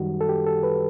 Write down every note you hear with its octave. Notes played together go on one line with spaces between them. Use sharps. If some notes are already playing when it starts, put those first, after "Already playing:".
Already playing: F#2 D#3 G3 F#4
A4
G4
A4
B4